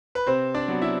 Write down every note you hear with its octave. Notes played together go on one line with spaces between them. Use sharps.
B4
C3 C4 C5
D4 D5
F#3 B3
E4 E5